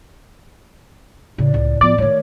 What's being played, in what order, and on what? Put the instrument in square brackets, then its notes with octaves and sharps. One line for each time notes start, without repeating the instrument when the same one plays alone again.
[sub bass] A2 [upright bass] C#3 [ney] D5
[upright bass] C#2
[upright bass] F3 [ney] B3 [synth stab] D5
[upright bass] D#3 A3 [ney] C#5